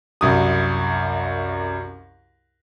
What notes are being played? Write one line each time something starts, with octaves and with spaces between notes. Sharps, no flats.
C2 F#2 D#6